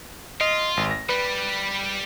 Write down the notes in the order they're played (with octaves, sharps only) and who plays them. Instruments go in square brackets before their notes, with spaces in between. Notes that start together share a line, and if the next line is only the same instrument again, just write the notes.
[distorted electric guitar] F4 [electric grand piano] D#5
[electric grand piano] G#1
A#6
[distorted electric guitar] G3 [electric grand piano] B4